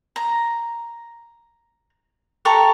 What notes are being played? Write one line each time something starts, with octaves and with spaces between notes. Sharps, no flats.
A#5
G4 A4 A#5 C#6